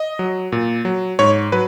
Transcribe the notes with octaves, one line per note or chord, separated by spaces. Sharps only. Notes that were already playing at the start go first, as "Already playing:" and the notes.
Already playing: D#5
F#3
A#2
F#3
G#2 C#5
F#3 B4